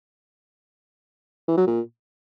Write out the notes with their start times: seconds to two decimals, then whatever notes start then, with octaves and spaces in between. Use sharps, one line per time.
1.48 E3
1.57 F#3
1.67 A#2